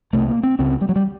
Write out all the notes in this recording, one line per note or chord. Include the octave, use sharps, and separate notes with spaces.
C2 C3 A3
A#3
C4
C#2 C#3 C4
G3
F#3
G3